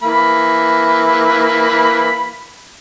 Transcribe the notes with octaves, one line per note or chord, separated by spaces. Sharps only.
E3 A#3 B5